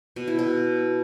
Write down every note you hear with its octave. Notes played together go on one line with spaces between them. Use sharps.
B2
E4
B2